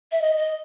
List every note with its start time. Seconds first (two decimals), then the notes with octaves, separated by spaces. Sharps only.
0.12 E5
0.21 D#5
0.37 D#5